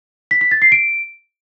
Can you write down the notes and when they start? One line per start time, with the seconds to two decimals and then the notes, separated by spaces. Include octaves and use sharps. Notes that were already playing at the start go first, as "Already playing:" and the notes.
0.31 B6
0.41 B6
0.51 A6
0.62 C7
0.72 D7